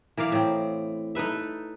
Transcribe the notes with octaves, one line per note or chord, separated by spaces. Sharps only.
E3 A#4 D5 F5
A2 C4
D#4 A4 B4 E5